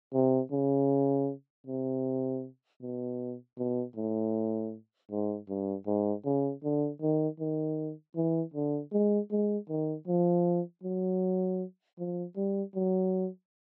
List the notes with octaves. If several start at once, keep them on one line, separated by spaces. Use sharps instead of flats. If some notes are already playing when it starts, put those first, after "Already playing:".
C3
C#3
C3
B2
B2
A2
G#2
G2
G#2
C#3
D3
D#3
D#3
E3
D3
G#3
G#3
D#3
F3
F#3
F3
G3
F#3